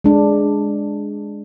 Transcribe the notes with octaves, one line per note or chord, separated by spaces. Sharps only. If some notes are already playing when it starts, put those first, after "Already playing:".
G#3 D4